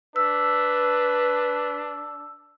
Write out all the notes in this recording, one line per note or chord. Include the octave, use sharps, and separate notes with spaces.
D4 B4 E6